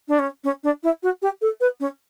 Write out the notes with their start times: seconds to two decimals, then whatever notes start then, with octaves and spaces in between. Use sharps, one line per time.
0.08 D4
0.19 C#4
0.44 C#4
0.64 D4
0.83 E4
1.03 F#4
1.22 G4
1.41 A4
1.61 B4
1.80 C#4